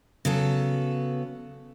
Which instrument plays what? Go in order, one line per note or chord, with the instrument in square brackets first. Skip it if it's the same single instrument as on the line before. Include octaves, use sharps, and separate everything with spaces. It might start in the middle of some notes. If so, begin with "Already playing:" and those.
[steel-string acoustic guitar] C#3 F#3 B3 A4